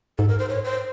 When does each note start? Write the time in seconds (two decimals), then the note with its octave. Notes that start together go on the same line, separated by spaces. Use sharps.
0.18 G#2 A4
0.29 A#4
0.39 C5
0.49 C#5
0.64 C5